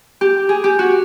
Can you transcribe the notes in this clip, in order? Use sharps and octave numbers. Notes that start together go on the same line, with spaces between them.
G4
G#4
G4
F#4